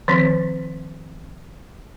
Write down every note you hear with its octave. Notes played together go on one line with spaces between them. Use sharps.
D#3 F3 C4